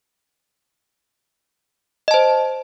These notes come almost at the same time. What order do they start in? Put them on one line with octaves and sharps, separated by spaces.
D#5 A5 C5